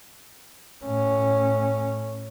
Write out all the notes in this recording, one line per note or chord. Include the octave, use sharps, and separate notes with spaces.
A2 C#4